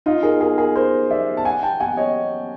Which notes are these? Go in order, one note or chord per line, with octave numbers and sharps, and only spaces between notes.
D#4 F4
G#4 A#4
G#4 A#4
G#4 A#4
A#4 C5
D5 E5
A5
F#5 G#5
G5 A5
F#5 G#5
C#5 D#5